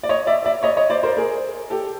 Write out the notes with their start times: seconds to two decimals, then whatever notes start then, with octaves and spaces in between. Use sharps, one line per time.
0.03 D5
0.09 C#5 D#5
0.27 D5 E5
0.45 D5 E5
0.63 C#5 D#5
0.77 C#5 D#5
0.90 C5 D5
1.03 A#4 C5
1.17 G#4 A#4
1.70 G4 A4